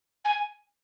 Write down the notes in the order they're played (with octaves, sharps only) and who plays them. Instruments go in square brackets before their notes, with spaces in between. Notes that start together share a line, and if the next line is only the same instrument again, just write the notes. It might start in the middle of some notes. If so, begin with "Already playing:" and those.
[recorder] G#5